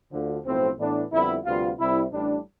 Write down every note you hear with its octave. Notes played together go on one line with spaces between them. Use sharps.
D2 D3 F3
B1 A2 F3 C4
A2 E3 B3 D4
F2 D3 G3 B3 E4
D2 C3 G3 B3 F4
C2 C3 G3 C4 E4
A1 A2 G3 D4